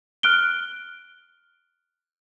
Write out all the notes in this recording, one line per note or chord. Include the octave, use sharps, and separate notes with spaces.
F6 F#6 D7 G7